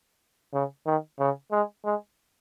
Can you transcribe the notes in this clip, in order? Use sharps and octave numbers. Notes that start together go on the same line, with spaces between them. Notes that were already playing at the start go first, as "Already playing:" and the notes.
C#3
D#3
C#3
G#3
G#3